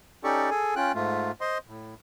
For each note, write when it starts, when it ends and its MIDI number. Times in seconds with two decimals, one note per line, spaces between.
0.24 0.50 61
0.24 0.50 63
0.24 0.50 67
0.24 0.50 69
0.24 0.50 74
0.24 0.50 85
0.50 0.75 68
0.50 0.75 69
0.50 0.75 80
0.76 0.92 61
0.76 0.92 65
0.76 0.92 79
0.76 0.92 90
0.94 1.31 44
0.94 1.31 57
0.94 1.31 65
1.41 1.58 72
1.41 1.58 75
1.41 1.58 84
1.68 1.95 45